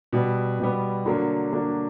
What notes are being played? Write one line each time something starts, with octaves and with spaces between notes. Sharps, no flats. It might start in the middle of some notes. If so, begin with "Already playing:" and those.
B2 G3 B3
B2 G3 B3
D3 F#3 A#3 D4
D3 F#3 A#3 D4